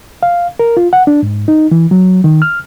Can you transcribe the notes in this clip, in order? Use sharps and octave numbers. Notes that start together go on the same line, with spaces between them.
F5
A#4
F4
F#5
D4
G#2
D#4
E3
F#3
D#3
F6